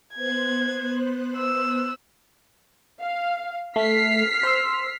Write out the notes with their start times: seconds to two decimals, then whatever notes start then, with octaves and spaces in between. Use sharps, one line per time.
0.15 B3 C5 F#6 G#6
1.37 E6
3.01 F5
3.76 A3 F6 B6 C7
4.43 C5 C6 E6